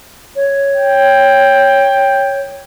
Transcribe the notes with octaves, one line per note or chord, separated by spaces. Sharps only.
C#5
G5